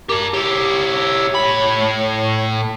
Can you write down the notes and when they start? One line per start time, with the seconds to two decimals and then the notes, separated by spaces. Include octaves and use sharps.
0.09 G4 A#4 A5
0.34 E4 G4 C#5
1.35 A2 B5